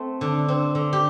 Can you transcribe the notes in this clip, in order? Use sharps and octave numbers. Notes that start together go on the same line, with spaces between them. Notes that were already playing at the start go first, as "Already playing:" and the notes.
Already playing: A3 C4
D3
C4
D3
G4